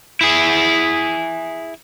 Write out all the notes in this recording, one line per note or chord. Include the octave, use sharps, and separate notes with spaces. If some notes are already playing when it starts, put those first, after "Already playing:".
E4 G#4